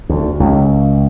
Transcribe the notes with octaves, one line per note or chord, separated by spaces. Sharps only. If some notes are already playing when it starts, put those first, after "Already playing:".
D2
C#2